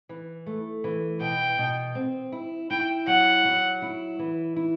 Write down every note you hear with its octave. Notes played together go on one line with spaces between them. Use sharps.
E3
A3
E3
B2 G5
B2
C4
E4
E4 G5
F#3 F#5
F#3
E4
E3
E4